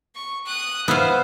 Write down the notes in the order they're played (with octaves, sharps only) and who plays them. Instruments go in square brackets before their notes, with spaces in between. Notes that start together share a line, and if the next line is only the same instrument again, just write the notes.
[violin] C#6
D#6 F#6
[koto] B3 [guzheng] E4 F5 [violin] C5